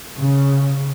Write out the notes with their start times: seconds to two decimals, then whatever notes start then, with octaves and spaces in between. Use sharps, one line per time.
0.18 C#3